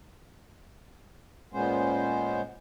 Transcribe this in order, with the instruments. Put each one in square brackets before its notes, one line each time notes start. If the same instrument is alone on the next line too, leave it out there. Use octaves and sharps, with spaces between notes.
[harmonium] A#2 G#3 B3 C#4 C5